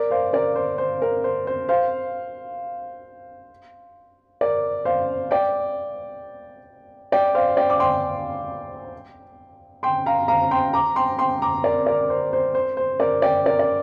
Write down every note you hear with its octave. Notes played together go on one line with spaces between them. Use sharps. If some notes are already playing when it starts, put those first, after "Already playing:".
Already playing: A#4 D5
C5 F5
A#4 D5
C5
C5
A#4
C5
C5
C5 F5
A#4 D5
C5 F5
D5 G5
D5 G5
C5 F5
D5 G5
D6
G5 C6
G5 C6
F5 A#5
F5 A#5
G5 C6
A#5 D6
G5 C6
G5 C6
A#5 D6
A#4 D5
A#4 D5
C5
C5
C5
C5
A#4 D5
D5 G5
A#4 D5
D5